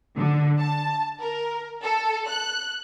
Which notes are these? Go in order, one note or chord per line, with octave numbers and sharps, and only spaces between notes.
D3
A5
A#4
A4
F#6